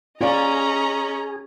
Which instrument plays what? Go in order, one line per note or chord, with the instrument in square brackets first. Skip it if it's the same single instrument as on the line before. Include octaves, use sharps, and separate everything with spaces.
[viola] C#4 [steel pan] F4 D5 [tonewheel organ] G#4 [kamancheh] D#5 A#5